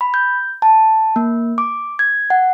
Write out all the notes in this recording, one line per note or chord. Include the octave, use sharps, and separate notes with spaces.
B5
G6
A5
A#3
D6
G#6
F#5